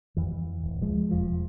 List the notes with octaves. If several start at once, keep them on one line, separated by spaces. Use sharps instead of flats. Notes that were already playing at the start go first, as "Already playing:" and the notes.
F2 E3
D1
F3 G#3
E1 F2 F3